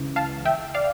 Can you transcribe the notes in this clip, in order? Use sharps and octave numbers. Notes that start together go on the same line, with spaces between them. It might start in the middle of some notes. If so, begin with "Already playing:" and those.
Already playing: C#2 C#3 E3
F5 A5
E5 G5
D5 F5